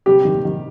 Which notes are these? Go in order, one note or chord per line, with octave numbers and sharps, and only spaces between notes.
C3 G3 G4
D#3
D#3